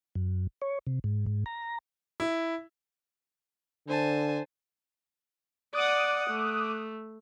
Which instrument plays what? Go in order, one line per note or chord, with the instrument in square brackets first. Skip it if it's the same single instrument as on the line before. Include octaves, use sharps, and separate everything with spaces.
[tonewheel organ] F#2
C#5
C3
G#2
G#2
A#5
[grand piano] E4
[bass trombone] D3 [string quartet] C5 G#5 A5
[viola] D5 F#5 [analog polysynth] D6 D#6 F#6
[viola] A3